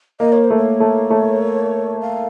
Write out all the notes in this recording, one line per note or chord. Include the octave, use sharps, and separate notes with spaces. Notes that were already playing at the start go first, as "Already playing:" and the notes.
A#3 D#5
C#5
C5
A3
C#5
A3
A3
F5